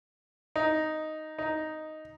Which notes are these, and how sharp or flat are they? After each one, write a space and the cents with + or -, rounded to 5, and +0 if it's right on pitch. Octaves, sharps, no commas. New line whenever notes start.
D#4 +0
D#4 +0